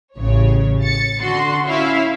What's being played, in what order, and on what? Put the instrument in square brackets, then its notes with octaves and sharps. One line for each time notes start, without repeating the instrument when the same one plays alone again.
[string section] A1 C#3 C#5
A6 C#7
D3 F#4 C6
C#4 E4 E5 F5